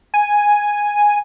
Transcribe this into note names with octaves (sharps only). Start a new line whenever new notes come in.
G#5